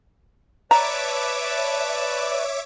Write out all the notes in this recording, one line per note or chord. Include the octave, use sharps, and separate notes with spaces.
B4 C#5 D5 E5 A5 A#5 D6